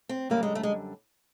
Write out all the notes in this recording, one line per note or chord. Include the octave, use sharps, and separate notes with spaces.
C4
F#2 D3 G3 A#3
G#3
A3
G#3